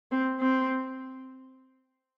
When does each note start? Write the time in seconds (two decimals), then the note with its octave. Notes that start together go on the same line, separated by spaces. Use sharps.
0.11 C4
0.40 C4